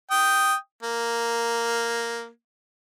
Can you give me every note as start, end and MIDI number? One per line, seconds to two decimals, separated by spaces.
0.11 0.54 79
0.11 0.54 87
0.83 2.28 58